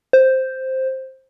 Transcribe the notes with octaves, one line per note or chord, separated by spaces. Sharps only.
C5